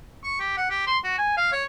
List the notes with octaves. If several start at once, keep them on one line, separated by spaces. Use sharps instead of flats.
C#6
G4
F#5
G4
C6
F#4
G#5
F5
C#5